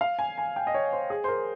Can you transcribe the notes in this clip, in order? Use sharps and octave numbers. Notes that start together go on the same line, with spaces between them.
F5
G#5
G#5
G5
D#5
C#5
C5
G#4
C5
A#4